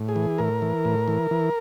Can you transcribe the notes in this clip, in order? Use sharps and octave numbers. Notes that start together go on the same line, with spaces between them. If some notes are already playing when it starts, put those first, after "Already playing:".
Already playing: A2
G#4
E3
A2 A#4
E3
A2
E3
E3